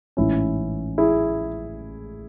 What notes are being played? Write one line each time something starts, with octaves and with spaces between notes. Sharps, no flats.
A1 G#2 E3 C#4 E4
E4 G#4